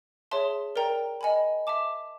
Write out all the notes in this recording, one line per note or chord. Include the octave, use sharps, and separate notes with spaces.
G#4 C#5 E5 A5 C6
A#4 D5 G5 A#5
D#5 G#5 B5
E5 A5 D6